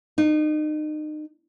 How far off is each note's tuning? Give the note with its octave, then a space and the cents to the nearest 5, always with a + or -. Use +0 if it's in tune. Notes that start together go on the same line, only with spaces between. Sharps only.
D#4 -30